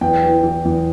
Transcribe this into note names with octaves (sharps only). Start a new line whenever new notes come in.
E2 G5
E3
E3
E2